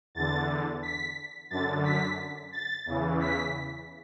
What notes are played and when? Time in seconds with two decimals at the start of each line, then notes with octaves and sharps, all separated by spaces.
0.15 E2 D3 A6
0.83 B6
1.50 F#2 D3 A6
1.84 B6
2.52 A6
2.86 E2 C#3 E3
3.20 B6